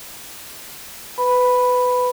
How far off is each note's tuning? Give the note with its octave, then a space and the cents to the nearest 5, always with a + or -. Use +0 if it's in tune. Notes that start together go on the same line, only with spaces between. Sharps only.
B4 +20 B5 +0